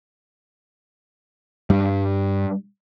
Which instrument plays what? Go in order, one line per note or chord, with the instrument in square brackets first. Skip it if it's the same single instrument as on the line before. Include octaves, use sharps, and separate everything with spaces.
[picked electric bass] G2 G3